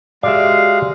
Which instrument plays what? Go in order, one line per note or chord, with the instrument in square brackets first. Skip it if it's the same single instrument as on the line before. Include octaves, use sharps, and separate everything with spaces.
[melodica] G#3 F5 [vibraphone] F#4 G4 [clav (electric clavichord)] D5 E5